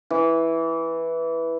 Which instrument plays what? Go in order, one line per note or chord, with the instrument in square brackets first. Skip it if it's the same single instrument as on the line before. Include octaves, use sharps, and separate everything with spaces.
[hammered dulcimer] E3